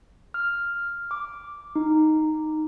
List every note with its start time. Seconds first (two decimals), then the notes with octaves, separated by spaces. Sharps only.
0.34 F6
1.11 D6
1.76 D#4